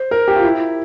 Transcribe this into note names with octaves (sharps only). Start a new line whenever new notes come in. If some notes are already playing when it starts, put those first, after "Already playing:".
Already playing: C5
A#4
G4
F4
E4